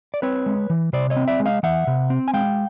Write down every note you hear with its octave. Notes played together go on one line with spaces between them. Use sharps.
D5
C4 B4 C#5
G#3
E3
C3 C5 D5
C#5 D#5
C4
D5 E5
G#3
D#5 F5
E3 E5 F#5
C3
C4
G#5
G#3 F5 G5